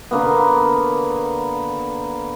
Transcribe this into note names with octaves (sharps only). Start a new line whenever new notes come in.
D3 A#3 B3